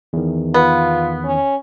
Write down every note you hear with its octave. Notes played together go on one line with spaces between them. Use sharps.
E2 D#3
B3 F4
C#4